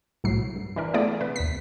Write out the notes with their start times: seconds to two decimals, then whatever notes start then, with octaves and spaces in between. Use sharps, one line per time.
0.24 C2 A2 F#3 C7
0.56 G2
0.76 E3 D4 A#4
0.94 A3 B3 E4 G#4 D5
1.21 C3 B4
1.36 D#2 B6